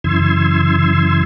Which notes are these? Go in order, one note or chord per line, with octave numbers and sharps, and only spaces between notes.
F#2 C#3 E3 C6 E6 G#6